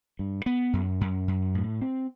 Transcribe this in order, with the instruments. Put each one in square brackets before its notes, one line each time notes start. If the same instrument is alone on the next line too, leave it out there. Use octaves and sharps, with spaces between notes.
[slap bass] G2
B3
F#2
F#2
F#2
A2
C4